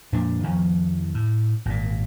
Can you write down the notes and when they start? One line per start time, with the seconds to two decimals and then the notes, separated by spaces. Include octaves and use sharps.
0.12 F2 A#2 D4
0.43 F2 D#3 F3
1.14 A2
1.66 G#1 A#2